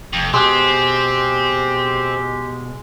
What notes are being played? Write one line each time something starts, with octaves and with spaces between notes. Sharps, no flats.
F1 F2
B2 G#3 C4 G4